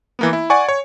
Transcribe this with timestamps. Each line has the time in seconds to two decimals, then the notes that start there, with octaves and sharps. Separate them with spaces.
0.19 E3 A#3 B3
0.33 E4
0.50 D5 F#5 G#5 C#6
0.69 C#5